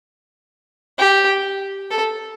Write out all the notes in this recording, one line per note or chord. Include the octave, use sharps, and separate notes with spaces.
G4
A4